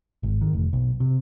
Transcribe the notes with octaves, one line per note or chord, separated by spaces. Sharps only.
G#1
D#3
F1
B1
C3